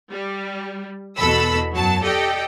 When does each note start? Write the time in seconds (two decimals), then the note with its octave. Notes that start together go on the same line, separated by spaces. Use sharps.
0.12 G3
1.17 E2 B2 A4 B5 E6
1.73 F#2 F#3 A5
2.02 G4 A4 D5 D#5 G5